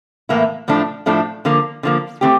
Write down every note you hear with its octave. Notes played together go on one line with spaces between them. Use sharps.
A2 E3 A#3 E4
A2 F3 A3 D4
A2 F3 A3 D4
D3 F3 A#3
D3 F3 A#3
E3 A3 C4 G4